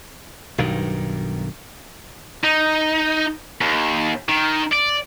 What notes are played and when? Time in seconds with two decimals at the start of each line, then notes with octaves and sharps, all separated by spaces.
0.58 B1 G2 D#3
2.44 D#4
3.61 D#2
4.29 D#3
4.72 D5